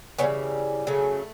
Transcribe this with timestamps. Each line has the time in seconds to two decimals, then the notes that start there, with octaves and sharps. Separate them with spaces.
0.19 C#3 E3 G3 B3 C#4
0.87 C#3 F#3 A3